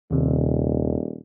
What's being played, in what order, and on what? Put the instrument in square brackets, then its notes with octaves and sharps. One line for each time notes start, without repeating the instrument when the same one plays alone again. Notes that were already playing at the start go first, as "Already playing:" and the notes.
[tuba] D#1 [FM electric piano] D#2 C3